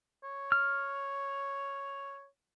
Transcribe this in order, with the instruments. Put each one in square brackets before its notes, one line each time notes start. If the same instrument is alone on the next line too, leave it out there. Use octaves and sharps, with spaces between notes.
[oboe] C#5
[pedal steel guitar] F6